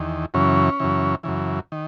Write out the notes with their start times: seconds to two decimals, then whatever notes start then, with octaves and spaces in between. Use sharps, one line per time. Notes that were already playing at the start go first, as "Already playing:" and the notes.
Already playing: E2 D#3
0.34 F#2 C#3 E3 C#4
0.80 F#2 C#3 E3
1.23 F#2 C#3 E3
1.72 D#3